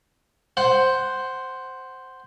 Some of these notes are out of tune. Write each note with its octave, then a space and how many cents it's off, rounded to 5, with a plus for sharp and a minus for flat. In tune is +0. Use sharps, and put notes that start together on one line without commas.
C5 +0 F#5 +15